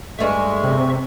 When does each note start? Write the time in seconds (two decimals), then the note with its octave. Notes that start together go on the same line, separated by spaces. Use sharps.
0.19 G2 G#3 A3 E5 C#6
0.63 C3